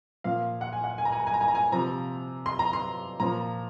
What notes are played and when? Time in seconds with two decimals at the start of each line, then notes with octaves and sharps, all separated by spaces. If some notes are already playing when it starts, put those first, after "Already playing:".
0.24 A#2 F3 F5
0.61 F#5
0.73 G#5
0.84 F#5
0.98 G#5
1.05 A#5
1.12 G#5
1.19 A#5
1.27 G#5
1.34 A#5
1.41 G#5
1.48 A#5
1.55 G#5
1.72 C3 F3 A#5
2.46 C6
2.59 A#5
2.73 C6
3.20 A#2 F3 A#5